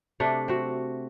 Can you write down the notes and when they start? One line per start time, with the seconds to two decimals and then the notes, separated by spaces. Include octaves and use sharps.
0.20 C3 A3 D4
0.48 C4 F#4